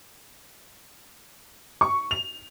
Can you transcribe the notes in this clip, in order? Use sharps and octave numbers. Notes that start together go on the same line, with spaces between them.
C#6
F7